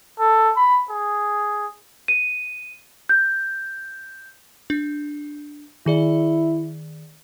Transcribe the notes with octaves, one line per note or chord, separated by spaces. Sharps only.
A4
B5
G#4
D#7
G6
D4
D#3 E4 G#4 D5